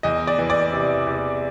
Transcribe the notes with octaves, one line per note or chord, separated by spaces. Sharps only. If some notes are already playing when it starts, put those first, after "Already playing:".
E2 D#5
D5
E3
D5
C3
E2